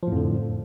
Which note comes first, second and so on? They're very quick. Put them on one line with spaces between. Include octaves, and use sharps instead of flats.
F3 A2 F2 D3